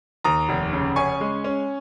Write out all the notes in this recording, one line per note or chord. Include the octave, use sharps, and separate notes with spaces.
D#2 A#5 D#6
F1
C#3
C#4 G#5 C#6
G#3
C#4